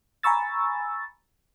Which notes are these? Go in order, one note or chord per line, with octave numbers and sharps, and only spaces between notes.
G#5 A#5 B5 C#6 E6 A6